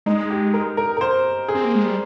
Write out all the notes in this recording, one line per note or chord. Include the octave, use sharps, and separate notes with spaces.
G#3 D#4
G4
A#4
A#4
A#4
C5
G#4
C4
A#3
G#3
G3